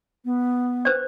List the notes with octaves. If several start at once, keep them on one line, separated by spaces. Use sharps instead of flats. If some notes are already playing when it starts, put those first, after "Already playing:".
B3
B4 C5 D5